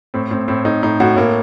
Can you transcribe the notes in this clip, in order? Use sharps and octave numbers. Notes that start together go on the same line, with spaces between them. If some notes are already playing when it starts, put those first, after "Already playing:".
A2 C4
A2 C4
A2 C4
A2 D#4
A2 D#4
A2 F#4
A2 A#3